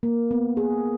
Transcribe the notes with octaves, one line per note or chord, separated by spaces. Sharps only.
A#3
B3
G#4